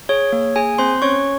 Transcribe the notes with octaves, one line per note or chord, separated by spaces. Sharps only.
G#4 C#5
A#3
G#4 G#5
C4 C5 C6
C#4 C#5 C#6